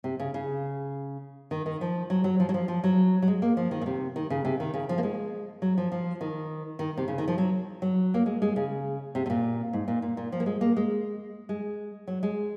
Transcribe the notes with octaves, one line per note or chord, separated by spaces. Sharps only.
C3
C#3
C#3
D#3
D#3
F3
F#3
F#3
F3
F#3
F3
F3
F#3
F#3
G#3
A#3
F3
D#3
A#2
C3
D#3
C#3
C3
D#3
C#3
F3
A#3
G#3
F#3
F3
F3
D#3
D#3
C3
C#3
D#3
F3
F#3
F#3
A#3
G#3
G#3
C#3
C3
C3
A#2
G#2
A#2
A#2
A#2
F3
A#3
G#3
A#3
G#3
G#3
F#3
G#3